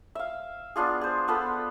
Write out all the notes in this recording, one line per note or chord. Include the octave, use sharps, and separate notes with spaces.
E5 F5
B3 D4 F4 G#4
G#4 C5
B3 F4 A4 B4